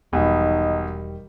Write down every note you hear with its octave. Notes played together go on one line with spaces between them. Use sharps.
E1 B1 D#3 G3 D#4 B5